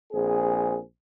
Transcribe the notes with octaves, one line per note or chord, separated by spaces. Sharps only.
A#1 C4 G#4